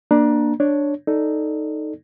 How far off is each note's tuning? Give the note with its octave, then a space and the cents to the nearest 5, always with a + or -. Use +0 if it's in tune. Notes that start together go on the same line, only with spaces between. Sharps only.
A#3 +10 D4 +15 A#5 +30
D4 +0 C#5 +0
D#4 +0 A4 +0 D5 +0